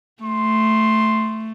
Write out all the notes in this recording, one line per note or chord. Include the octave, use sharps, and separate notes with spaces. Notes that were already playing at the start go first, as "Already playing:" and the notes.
A3 C6